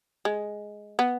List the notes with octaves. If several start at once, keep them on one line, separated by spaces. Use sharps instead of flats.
G#3
B3